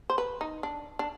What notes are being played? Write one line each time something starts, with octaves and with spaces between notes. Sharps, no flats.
C5
B4
D#4
D4
D4